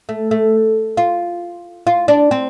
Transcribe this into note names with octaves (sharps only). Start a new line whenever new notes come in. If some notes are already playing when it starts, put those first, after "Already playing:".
A3
A3
F4
F4
D4
C4